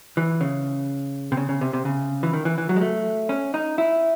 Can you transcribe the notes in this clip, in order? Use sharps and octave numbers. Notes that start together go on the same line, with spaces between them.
E3
C#3
C3
C#3
C#3
C3
C3
C#3
E3
D#3
E3
E3
F#3
G#3
A3
C#4
D#4
E4